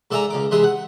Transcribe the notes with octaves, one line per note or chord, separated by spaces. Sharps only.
G#2 A4 D5 E5 G#5 A#5
C#2 C#3 D6
C3 E3 G#3 E5 D#6
F#5